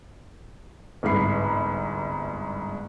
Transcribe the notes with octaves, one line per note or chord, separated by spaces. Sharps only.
G1 C2 G#2 B5 C7